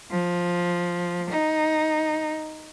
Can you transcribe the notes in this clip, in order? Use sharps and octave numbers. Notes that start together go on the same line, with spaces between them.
F3
D#4